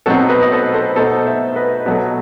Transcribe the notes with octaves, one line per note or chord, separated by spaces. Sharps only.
B2 F#3 A3 C4 D#4 F#4 A4
B4 D#5
D#5
A4 C5
A4 C5
B2 A3 D#4 A4 C5
C5 E5
B4 D#5
B2 F#3 A3